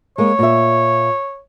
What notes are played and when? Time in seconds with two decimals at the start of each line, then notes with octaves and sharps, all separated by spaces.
0.18 G#3 A#3 C#5
0.39 A#2 E5